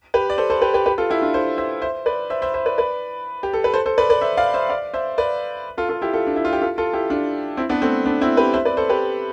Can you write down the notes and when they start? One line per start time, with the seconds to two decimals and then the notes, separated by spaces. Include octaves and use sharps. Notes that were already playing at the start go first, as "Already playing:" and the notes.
0.14 G4 B4
0.30 D5
0.38 A4 C5
0.50 A4 C5
0.62 G4 B4
0.74 G4 B4
0.86 G4 B4
0.98 F4 A4
1.10 E4 G4
1.22 D4 F4
1.34 A4 C5
1.58 C5 E5
1.82 C5 E5
2.06 B4 D5
2.30 C5 E5
2.42 C5 E5
2.54 C5 E5
2.66 B4 D5
2.78 B4 D5
3.43 G4
3.53 A4
3.64 B4
3.74 A4 C5
3.86 A4 C5
3.98 B4 D5
4.10 B4 D5
4.21 C5 E5
4.37 D5 F5
4.54 C5 E5
4.70 D5 F5
4.94 C5 E5
5.18 B4 D5
5.78 F4 A4
5.89 F4 A4
6.02 E4 G4
6.13 F4 A4
6.27 D4
6.36 E4
6.45 F4
6.53 G4
6.62 F4 A4
6.78 F4 A4
6.93 E4 G4
7.10 D4 F4
7.57 C4 E4
7.69 B3 D4
7.82 A3 C4
8.06 B3 D4
8.21 C4 E4
8.37 G4 B4
8.54 C5 E5
8.65 B4 D5
8.77 A4 C5
8.89 G4 B4